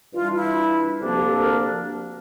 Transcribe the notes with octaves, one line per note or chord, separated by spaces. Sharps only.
G2 E3 G3 D4 F4
F4
E4
D2 C3 F3 A#3 D4
G4
A4
A#4